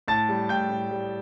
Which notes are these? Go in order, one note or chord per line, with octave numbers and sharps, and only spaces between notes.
A2 A5 A6
G3
A2 G5 G6
A2
G3